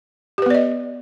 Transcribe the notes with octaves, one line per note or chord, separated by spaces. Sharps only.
B3 G4 B4 D5 D#5